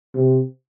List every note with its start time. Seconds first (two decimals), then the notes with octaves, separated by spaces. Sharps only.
0.15 C3